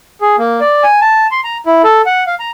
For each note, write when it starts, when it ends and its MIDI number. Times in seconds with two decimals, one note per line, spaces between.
0.21 0.36 68
0.38 0.60 58
0.60 0.83 74
0.83 1.00 80
1.01 1.27 81
1.31 1.40 84
1.44 1.57 82
1.66 1.82 64
1.84 2.02 69
2.06 2.24 78
2.27 2.35 77
2.40 2.51 82